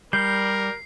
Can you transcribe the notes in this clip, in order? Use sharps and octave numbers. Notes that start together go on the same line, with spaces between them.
G3 A#4 G6 C7